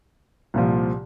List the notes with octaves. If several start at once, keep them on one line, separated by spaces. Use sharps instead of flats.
C2 A#2 F3